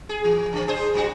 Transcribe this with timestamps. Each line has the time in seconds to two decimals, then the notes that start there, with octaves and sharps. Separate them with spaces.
0.09 G#4
0.24 E3
0.52 C#3 C4
0.67 D4 G#4 C5
0.94 B2 G3 F#4